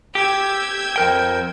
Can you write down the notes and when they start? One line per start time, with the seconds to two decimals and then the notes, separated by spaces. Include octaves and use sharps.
0.15 G4 E6 G6 G#6
0.96 F2 A#4 G5